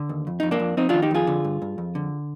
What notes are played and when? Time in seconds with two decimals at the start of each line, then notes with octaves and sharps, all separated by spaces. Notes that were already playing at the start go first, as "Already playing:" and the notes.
Already playing: D3
0.09 D#2
0.27 F2
0.40 F2 D#4
0.51 A#3 D4
0.60 F2
0.77 F2 C4 D#4
0.89 D#3 D4 F4
1.02 D#4 G4
1.11 F2 F4 G#4
1.27 D3
1.44 G2
1.62 G2
1.78 F2
1.95 D3